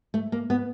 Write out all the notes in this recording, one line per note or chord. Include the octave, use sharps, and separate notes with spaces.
A3
A#3
B3